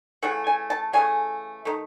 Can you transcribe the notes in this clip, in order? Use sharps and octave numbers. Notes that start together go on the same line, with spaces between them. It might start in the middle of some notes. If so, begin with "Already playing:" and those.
C#3 E3 A3 F#5
G#5
A5
C#3 E3 A3 G#5
D#3 A3